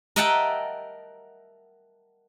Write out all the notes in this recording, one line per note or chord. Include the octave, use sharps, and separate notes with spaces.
A#4 D#5 E5 F#5 G5 A5